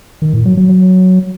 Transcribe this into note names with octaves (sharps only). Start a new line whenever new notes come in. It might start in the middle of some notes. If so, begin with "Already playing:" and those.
D#3
A2
F#3
F#3
F#3